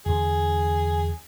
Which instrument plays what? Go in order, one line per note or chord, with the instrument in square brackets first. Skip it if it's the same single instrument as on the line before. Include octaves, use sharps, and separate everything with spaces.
[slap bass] E2 D3 B3 [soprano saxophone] G#4